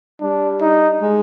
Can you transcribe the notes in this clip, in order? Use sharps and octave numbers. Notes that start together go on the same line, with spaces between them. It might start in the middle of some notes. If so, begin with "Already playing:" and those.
G3 D4
D#4
G#3